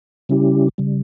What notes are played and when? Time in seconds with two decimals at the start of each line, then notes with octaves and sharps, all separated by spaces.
0.29 C#3 G3 C#4 E4 G4
0.78 C#3 G3